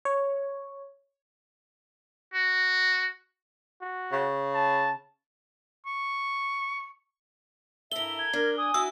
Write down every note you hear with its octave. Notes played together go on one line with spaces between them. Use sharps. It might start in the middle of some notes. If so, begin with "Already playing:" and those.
C#5
F#4
F#4
C#3
A5
C#6
G2 E4 A4 A#4 E5 G7
G#6
D4 A#4
G#5 D#6
E4 F#4 E6